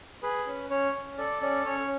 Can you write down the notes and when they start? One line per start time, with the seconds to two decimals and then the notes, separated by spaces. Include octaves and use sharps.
0.23 G#4 B4
0.47 C#4
0.70 C#4 C#5
0.95 C#4
1.18 A4 D5
1.41 C#4 D5
1.65 C#4 C#5